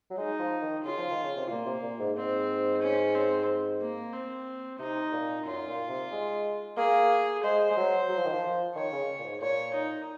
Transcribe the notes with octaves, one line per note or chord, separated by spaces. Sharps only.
F#3
G#3 D#4
F3
D#3
C#3 F4
F3
D#3
C#3
C3
A#2 A#3
C3
A#2
G#2
G#2 C4
C#4
C4
A#3
C4
C3 D#4
A#2
F#2 F4
A#2
C3
G#3
A#3 G#4
G#3 C5
G#3
F#3
F#3
F3
D#3
F3
D#3 C#5
C#3
A#2
G#2
A#2 C#5
D#4